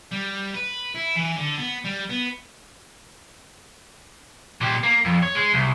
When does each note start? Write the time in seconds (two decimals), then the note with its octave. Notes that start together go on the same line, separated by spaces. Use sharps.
0.11 G3
0.54 B4
0.96 E4
1.16 E3
1.37 D3
1.59 B3
1.85 G3
2.09 B3
4.61 A#2 G4
4.83 A#3
5.05 F2
5.23 C#5
5.35 G#3
5.54 C2